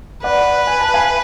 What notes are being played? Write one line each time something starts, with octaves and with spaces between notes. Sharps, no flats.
B4 D5 F#5
G#5
A5
F5 G#5